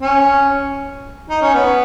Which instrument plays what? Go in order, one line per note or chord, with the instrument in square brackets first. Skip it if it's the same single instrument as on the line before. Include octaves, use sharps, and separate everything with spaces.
[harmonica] C#4
D#4
C#4
B3